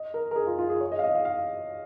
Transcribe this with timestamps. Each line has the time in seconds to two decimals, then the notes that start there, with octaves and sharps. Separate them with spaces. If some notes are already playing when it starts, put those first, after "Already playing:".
Already playing: D#5
0.14 A#4
0.31 A#4
0.36 G#4
0.47 F4
0.59 F4
0.69 G#4
0.81 C#5
0.92 D#5
0.99 F5
1.04 D#5
1.15 F5
1.25 F5